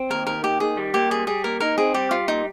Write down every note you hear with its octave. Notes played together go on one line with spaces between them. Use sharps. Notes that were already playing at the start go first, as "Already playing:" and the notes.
Already playing: C4
D#2 A#4
D#3 A#4
D#2 G4
D#3 G#4
G3
A#3 G4
G3 G#4
G3 G#4
A#3 A#4
D#4 A#4
C4 G#4
G3 G4
G3 F4
A#2 D#4